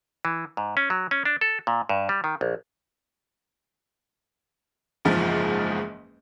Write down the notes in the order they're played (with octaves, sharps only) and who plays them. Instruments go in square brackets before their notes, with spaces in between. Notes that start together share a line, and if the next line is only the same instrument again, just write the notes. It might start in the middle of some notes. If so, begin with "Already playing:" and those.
[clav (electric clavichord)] E3
G#2
C#4
F#3
C#4
D4
A4
A#2
G2
G3
D#3
A#1
[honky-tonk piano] F#1 E2 G#2 F3